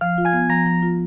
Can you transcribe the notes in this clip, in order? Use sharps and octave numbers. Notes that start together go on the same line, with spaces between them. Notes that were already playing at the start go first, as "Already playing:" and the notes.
F3 F5 F6
F4
G#5 G#6
B3
F3 A#5 A#6
F3
F4